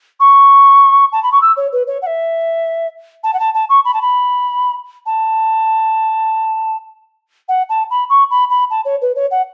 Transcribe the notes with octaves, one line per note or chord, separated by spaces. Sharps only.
C#6
A5
B5
C#6
E6
C#5
B4
C#5
F#5
E5
A5
F#5
A5
A5
C#6
B5
A5
B5
A5
F#5
A5
B5
C#6
B5
B5
A5
C#5
B4
C#5
F#5